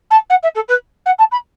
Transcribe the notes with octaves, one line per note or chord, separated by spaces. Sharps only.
A5
F#5
E5
A4
B4
F#5
A5
B5